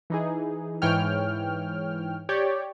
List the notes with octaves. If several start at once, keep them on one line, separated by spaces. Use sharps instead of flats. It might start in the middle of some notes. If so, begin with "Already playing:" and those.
E3 D#4 G#4
G#2 E3 C#5 G5 F6
G4 C#5 D5 G5